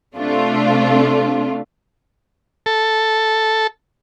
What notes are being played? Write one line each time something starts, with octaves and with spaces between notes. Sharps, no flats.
C3 A3 D4 F4
A4